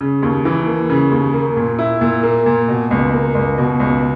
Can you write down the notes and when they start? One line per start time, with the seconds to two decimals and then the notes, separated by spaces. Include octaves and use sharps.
0.01 C#3
0.22 D#2
0.45 E3
0.68 A#3
0.90 C#3
1.11 D#2
1.34 A#3
1.57 A#2
1.79 E4
2.01 A#2
2.23 A#3
2.46 A#2
2.68 B2
2.91 C#2
3.13 A#3
3.35 C#2
3.58 B2
3.80 C#2